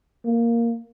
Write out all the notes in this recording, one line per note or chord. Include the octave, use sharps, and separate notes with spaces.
A#3